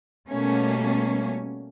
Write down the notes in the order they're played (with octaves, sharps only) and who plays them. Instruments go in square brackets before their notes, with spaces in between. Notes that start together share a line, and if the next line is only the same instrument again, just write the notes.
[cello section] B2 G3 A3 A#3 C#4